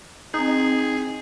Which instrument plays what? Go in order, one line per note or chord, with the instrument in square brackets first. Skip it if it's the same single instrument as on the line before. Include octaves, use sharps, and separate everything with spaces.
[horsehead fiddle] C4 [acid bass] D#4 [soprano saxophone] G#4